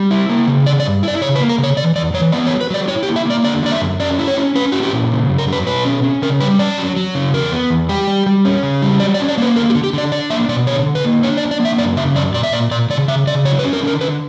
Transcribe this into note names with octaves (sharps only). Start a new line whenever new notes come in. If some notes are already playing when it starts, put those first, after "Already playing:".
Already playing: G3
E4
A#3
C#3
D3 D5
D5
G2
E4 D5
C#3 C#5
B4
A#3
A#4
C#3
C#5
E3 D5
E2 D5
E3 C#5
B3 D5
C#5
F#3
B4
F#3 D5
E4 C#5
G4
A#3
E5
A#3 D5
D3 D5
A#3 D5
E5
F#2
C#4 D5
E4
C#5
C#4
C#4 B4
E4 F#4
G4
A#2
C#3
F#2
A#4
F#3 B4
B2 B4
C#4
C#4
C#3 A#4
G3 B4
C#4 D5
F#3
F#3
C#3
E2 A#4
B3
E2
G3 G4
G3
G3
C#4
C#3
G3
F#3 D5
D5
C#4
D5
A#3 B4
D3 A#4
G4
D3
G4
D3 D5
D4 D5
A#3 E5
B2 D5
D3 C#5
D3
B4
A#3
D4 C#5
D5
D4
D5
A#3
E5
F#2 D5
C#3 E5
F#2 D5
A#2 D5
E5
A#2 D5
A#2 D5
C#3 D5
C#3 E5
C#3 D5
F#3 C#5
B4
C#4
A#4
D3
A#4
D3 B4